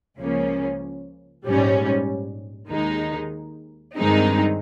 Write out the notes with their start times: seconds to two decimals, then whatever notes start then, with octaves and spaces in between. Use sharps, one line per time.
0.19 C#2 C#3 F3 A#3 C#4
1.44 A#1 G#2 G3 C#4
2.70 D#2 D#3 G#3 D#4
3.96 G2 D#3 G#3 C4 D#4